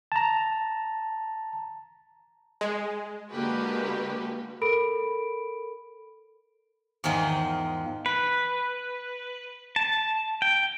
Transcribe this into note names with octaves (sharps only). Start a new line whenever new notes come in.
A5 A#5
G#3
D3 G#3 A#3 F#4 G4 B4
A4 A#4 B5 D7
E2 G#2 D#3 F3
B4
A5
G5